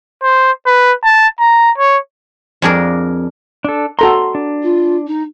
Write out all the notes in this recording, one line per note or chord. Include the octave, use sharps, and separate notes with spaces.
C5
B4
A5
A#5
C#5
F2 D4 G#4 A#4
D4 A4
F#4 A4 A#5 C6
D4
F4
D#4